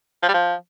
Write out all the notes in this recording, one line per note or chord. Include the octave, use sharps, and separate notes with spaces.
F3
G3
F3